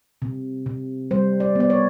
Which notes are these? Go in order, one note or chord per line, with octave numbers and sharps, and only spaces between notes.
C3
C3
G3 C5
D5
B3 D5
C#5